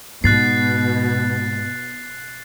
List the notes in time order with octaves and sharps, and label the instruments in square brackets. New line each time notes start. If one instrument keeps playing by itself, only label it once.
[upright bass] G#2 [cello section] B2 [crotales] F#6 A6 C7